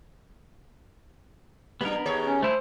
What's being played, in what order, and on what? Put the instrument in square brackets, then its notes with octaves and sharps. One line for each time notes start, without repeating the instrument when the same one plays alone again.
[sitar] F#3 D4 [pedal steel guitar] B3 A#4
[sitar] D#2 G#4 C#5
[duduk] C#4
[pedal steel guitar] A3 E4 G#4 [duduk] C5